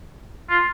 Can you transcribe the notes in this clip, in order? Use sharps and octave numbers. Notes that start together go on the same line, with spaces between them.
F4